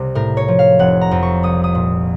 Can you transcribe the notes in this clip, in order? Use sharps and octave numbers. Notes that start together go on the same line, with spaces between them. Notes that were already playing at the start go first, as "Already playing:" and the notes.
Already playing: C2 C3
A2 A#4
C#5
F3
F5
F1 F#5
A#5
F2
C#6
C2 D#6
D#6
A#2